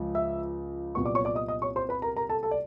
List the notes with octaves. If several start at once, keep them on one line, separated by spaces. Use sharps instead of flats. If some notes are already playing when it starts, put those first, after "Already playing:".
Already playing: C#2 F3
E5 E6
C2 A#2 F#3 B3 C#6
D5 D6
C#5 C#6
D5 D6
D#5 D#6
D#5 D#6
C#5 C#6
C5 C6
B4 B5
A#4 A#5
A#4 A#5
A4 A5
A4 A5
D5